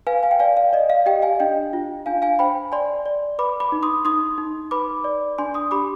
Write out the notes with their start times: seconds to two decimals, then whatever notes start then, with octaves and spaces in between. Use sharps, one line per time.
0.07 B4 F5 G#5
0.23 F5 G#5
0.31 G5
0.40 D5 F5 G#5
0.57 F5
0.73 D5 D#5
0.90 F5
1.06 G4 D#5 G5
1.22 F5 G#5
1.40 D4 D#5 G5
1.73 F4
2.06 D4 F5 G#5
2.22 F5 G#5
2.39 C5 G5 B5
2.72 D5 G#5 C6
3.06 D5
3.39 B4 B5 D6
3.60 B5 D6
3.72 D#4
3.83 C6 D#6
4.05 D#4 C6 D#6
4.38 D#4
4.71 B4 B5 D6
5.04 D5
5.38 D4 G#5 C6
5.54 C6 D#6
5.71 G4 B5 D6